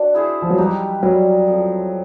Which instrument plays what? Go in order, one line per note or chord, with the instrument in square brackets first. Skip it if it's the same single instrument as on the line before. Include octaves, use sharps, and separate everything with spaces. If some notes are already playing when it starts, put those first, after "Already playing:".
Already playing: [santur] D4 F#4
E4 G#4 C5 E5
[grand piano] F3
F#3
[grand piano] G3 [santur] D#4 G4 B4
[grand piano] F#3 [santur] G3 A#3 C#4
[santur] F3 A3 C4